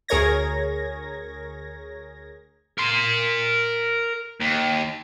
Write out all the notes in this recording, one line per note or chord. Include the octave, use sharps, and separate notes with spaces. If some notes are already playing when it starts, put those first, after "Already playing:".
D2 G#4 A#4 C#5 G#6 A#6
A#4 C6
D#2